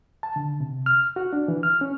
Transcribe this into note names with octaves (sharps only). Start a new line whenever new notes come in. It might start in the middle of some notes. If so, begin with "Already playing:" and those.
A5
D3
C3
F6
F#4
D4
E3
F6
C#4